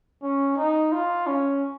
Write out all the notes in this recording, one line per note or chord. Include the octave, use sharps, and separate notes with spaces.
C#4
D#4
F4
C#4